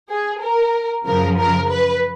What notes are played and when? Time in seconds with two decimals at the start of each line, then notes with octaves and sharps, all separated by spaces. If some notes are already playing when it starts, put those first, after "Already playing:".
0.10 G#4
0.42 A#4
1.06 F#2 C#3 F3 A#4
1.38 A#4
1.70 B4